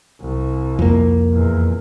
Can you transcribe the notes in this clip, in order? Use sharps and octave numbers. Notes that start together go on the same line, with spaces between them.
C2
F2 A#3
E2 A#2